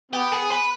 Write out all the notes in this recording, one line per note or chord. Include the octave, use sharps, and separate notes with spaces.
B3 G4
G#4
B4